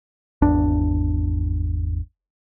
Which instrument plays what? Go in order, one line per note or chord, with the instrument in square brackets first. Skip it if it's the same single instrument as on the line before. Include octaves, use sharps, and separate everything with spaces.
[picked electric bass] G#1 E2 D4